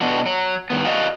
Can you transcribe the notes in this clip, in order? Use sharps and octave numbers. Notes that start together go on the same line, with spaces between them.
B2 D4 F#4
F#3
G2 D#3 B3
F#4 D5 D#5 F5 F#5